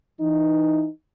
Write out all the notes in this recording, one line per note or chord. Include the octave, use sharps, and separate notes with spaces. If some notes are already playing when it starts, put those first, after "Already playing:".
E3 D#4